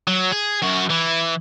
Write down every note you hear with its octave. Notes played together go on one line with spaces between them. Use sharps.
F#3
G#4
F#2 F#4
E3